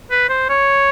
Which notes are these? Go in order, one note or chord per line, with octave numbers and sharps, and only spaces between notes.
B4
C5
C#5